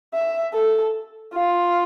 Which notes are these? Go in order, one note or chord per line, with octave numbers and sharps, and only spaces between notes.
E5
A4
F4